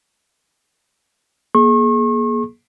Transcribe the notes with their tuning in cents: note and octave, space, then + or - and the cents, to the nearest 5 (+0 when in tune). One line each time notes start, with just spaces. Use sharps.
A#3 +25 G#4 +25 C#6 -40